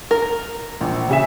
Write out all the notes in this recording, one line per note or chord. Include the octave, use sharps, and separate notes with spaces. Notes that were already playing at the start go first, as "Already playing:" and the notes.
A#4
A#1
C#3 G#4 E5